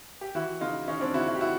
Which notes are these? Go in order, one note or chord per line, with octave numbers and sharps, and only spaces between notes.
G4
E3 E4 F#4
C#3 D#4 F4
E3 C#4 D#4
C4 D4
C#3 E4 F#4
E4 F#4
G4
E4 F#4